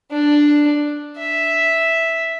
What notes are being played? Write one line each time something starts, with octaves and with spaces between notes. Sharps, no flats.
D4
E5